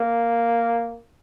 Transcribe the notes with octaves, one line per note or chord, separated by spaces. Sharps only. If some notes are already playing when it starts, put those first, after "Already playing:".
Already playing: A#3